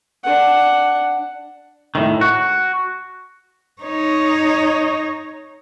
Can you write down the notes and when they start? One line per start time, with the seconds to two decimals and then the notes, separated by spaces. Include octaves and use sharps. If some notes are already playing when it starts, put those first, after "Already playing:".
0.24 D4 F#5
1.95 A2 D#3
2.21 F#4
3.82 D#4 C#5